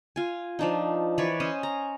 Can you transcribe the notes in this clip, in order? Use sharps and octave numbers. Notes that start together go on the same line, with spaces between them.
F4 G#5
F3 D4 D#4
E3 B4 C#5 D5
C#4 C5 D#5
A#5